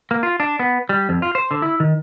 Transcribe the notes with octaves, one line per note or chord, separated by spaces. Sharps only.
A#3
F4
D4
B3
G3
F2
F4
C5
D3
E4
D#3